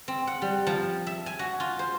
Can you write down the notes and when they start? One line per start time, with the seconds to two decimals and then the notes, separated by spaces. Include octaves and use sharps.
0.08 C4
0.27 F#5
0.42 G3
0.67 F3
1.07 E5
1.26 G#5
1.39 F#4
1.60 F4
1.79 C5